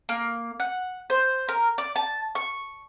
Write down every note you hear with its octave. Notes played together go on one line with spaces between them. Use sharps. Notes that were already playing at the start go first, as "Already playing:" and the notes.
A#3
F#5
C5
A#4
D5
A5
C#6